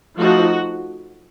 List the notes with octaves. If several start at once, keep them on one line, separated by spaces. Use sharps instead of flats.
F3 A3 D#4 F#4